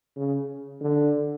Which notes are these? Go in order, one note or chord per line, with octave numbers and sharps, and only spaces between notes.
C#3
D3